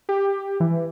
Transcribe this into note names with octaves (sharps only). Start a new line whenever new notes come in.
G4
E3